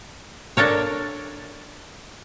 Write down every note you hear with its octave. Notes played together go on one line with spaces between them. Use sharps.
D4 A4 A#4 C#5